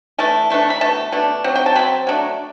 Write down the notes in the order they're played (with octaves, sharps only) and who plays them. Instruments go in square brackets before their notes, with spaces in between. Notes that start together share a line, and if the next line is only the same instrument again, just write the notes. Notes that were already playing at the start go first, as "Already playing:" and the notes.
[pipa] E3 A3 D4 A5
E3 A3 D4
B5
B2 A3 A5
B2 A3 D4
F#3 C4
G5
A5
F#3 C4 B5
F#3 A3 D4